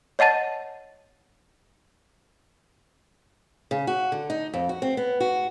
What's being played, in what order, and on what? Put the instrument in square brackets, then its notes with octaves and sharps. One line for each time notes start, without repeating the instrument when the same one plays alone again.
[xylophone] C#5 D#5 F#5 A5 A6
[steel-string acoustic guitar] C#3
F#4
D3
D#4
F2
F#4
C4
B3
F#4